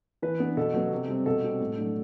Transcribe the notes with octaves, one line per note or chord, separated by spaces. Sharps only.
E3 B4
B3 D4
B2 A4
F#3 B3
C3
G3 C4
B2 A4
G3 C4
A2
F#3 A3 D4